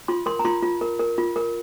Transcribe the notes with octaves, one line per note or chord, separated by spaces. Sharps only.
F4 C6
A#4 C6
A#5
F4 C6
F4
A#4
A#4
F4
A#4